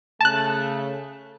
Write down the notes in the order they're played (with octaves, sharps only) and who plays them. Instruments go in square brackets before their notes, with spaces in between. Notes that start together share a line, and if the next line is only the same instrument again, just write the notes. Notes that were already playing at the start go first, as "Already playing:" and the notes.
[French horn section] C#3 A3 [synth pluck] A5 F#6